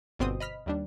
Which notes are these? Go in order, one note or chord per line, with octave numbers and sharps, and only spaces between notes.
G1 B2 C4 C6 D#6
D#5 B5 F6 B6
D#2 G3 D4